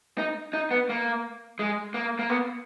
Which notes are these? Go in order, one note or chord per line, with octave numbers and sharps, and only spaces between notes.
D#4
D#4
B3
A#3
G#3
A#3
A#3
B3